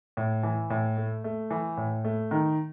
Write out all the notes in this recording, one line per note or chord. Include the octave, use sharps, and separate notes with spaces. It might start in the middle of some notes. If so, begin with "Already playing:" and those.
A2
E3
A2
A3
A3
E3
A2
A3
D#3